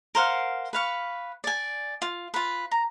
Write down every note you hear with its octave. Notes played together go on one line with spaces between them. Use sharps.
A#4 C5 F5 F#5
B4 F5 C#6
D5 G#5
F4
F4 B4
A#5